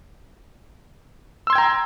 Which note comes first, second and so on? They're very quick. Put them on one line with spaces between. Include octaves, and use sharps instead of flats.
E6 C6 G#6 G5 A#5